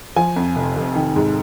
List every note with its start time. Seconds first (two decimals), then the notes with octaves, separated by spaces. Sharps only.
0.16 F3 G#5
0.36 F2
0.56 F1
0.76 F1
0.95 D#3
1.16 G#2